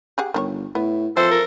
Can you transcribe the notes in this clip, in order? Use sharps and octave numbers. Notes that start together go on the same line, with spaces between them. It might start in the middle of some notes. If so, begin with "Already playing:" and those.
G4 G#4 F#5
G1 D#3 D4 C#5
A2 B3
E3 F3 C4 A4 C5 E5
A#4